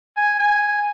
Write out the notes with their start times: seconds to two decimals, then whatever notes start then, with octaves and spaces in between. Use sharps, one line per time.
0.17 G#5
0.39 G#5